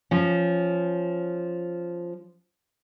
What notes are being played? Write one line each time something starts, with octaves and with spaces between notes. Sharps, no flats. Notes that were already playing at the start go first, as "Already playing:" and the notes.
F3 C#4